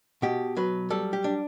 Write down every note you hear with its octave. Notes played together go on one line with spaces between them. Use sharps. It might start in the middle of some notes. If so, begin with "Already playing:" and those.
B2 G4
F#3 B4
G3 A4
G4
D4